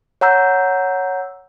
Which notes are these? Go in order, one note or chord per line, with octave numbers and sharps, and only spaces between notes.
C#5 F#5 A#5 E6 G6